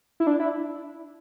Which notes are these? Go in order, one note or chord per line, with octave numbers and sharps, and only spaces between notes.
E4
D4
E4